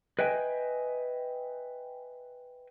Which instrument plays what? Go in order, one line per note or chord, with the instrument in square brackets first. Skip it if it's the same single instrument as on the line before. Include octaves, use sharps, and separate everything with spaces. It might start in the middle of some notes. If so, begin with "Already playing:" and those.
[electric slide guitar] B4 D#5 E5 G5 G#5